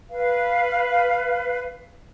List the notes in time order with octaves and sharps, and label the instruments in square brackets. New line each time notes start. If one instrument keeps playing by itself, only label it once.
[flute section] B4 F5